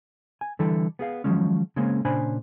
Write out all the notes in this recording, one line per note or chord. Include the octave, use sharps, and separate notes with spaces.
G#5
D3 E3 G3 E4 A4
B3 G#4 F5
D#3 F3 F#3 G#3 C#4
C#3 G#3 A#3 C4 C#4
A#2 C#3 D4 C5 G#5 B5